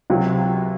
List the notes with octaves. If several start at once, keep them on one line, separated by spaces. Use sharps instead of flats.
C#2 C3 F#3